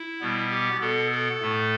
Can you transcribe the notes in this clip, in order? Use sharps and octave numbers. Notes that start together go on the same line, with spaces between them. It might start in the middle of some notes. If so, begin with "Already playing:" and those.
Already playing: E4
B2 G3 B3
G4
B2 B3 A4
A4
A2 A3